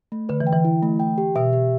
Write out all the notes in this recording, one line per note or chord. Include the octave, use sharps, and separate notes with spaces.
A3
D3 B4
E3
G5
E3
E4
A3
G5
G4
B2 E5
G4